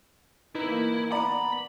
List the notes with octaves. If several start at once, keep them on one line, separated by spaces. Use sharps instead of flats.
E3 A#3 D#4 E4 B4
B3 D5 A#5 B5